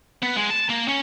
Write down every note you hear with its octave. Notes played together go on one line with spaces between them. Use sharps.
B3
G#3
A5
A#3
C#4